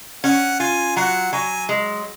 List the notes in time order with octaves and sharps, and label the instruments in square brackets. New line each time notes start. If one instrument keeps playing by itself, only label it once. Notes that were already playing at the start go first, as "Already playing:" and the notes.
[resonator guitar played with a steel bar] C#4 [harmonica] F#5
[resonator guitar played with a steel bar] F4 [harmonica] G#5
[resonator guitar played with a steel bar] F#3 [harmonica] F#5
[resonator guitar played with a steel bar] F#3 [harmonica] G#5
[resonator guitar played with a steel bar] G#3